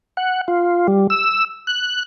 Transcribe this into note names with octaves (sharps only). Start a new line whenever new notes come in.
F#5
F4
G3
E6
F#6